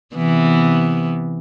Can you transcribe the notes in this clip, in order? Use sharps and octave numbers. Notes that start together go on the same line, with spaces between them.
C3 E3 B3